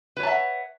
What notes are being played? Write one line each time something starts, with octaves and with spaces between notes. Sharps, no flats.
B4 C#5 E5 F#5 A5